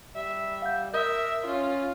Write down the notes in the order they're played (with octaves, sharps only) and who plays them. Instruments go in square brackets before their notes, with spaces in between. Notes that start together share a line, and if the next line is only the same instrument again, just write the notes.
[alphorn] G3 [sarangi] E5
[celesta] F5 F#5 G6
[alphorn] A#4 [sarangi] E5 [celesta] D#6 G6
[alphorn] C#4 [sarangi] F4